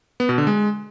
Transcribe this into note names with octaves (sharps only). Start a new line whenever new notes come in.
B3
B2
D3
G#3